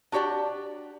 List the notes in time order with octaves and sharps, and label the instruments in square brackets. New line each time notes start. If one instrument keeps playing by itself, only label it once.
[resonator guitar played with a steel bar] D4 F#4 G4 D5 A5